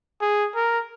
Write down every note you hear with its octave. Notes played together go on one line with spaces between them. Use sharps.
G#4
A#4